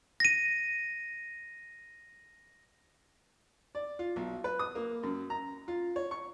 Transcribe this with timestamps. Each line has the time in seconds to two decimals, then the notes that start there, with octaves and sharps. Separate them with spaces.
0.20 A#6 D#7
3.75 D5
3.99 F4
4.16 B1
4.44 B4
4.59 D#6
4.75 A#3
5.03 F#2
5.30 A#5
5.68 F4
5.96 C#5
6.11 C#6